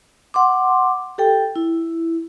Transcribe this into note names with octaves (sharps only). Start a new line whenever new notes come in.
F#5 C6 D6
G4 A4 G5
E4